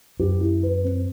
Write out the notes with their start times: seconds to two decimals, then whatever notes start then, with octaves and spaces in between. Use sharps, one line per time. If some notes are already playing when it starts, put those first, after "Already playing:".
0.19 F#2 G4
0.41 E4
0.63 B4
0.84 C4